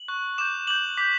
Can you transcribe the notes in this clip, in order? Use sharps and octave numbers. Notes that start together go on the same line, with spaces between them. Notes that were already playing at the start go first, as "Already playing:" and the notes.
Already playing: F#7
C#6 F#6
D6 G6 E7
D6 G6 F#7
D6 G6 B6